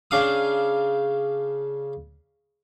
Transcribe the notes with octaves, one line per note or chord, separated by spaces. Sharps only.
C#3 D4 F5 D#6